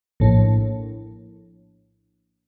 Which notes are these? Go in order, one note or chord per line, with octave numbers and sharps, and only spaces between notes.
A#1 A2